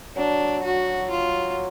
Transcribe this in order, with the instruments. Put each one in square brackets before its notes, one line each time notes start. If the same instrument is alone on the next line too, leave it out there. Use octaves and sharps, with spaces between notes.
[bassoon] F#3 [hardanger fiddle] D4
[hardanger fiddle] F#4
F4